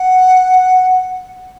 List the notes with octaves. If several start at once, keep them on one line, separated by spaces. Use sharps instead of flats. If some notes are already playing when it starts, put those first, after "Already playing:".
Already playing: F#5